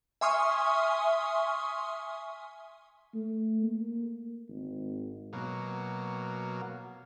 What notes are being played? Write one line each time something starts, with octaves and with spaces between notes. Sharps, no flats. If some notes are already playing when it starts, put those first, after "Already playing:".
E5 G#5 C6 C#6 D#6 F6
A3
A#3
G#1
B2 F#3 A#3